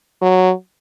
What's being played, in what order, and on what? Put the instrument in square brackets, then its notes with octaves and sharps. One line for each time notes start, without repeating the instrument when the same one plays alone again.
[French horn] F#3